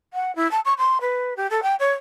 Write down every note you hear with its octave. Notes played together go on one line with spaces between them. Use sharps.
F#5
E4
A5
C#6
C6
B4
G4
A4
G5
C#5